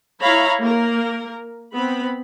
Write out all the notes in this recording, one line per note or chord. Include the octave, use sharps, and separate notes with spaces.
E4 C#5 F5 A#5 B5
A#3 A#4
B3 C4 B5